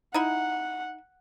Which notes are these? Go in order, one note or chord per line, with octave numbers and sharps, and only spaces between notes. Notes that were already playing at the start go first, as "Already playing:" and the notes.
D#4 E4 F#5